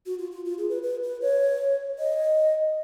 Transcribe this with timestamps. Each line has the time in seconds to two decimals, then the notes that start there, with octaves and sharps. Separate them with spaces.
0.06 F#4
0.19 F4
0.31 F4
0.45 F4
0.58 G#4
0.70 B4
0.82 B4
1.03 B4
1.21 C#5
1.99 D#5